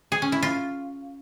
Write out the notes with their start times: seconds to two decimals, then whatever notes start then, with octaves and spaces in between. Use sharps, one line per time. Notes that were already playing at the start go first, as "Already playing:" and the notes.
0.12 G#4
0.22 C#4
0.32 E4
0.43 F4